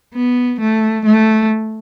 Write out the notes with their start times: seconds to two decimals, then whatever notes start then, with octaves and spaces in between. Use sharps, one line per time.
0.15 B3
0.60 A3
1.05 A3